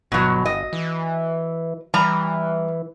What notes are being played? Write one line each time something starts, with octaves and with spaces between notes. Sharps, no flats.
G1 B2 F#3
D#5
E3
E3 G3 A#5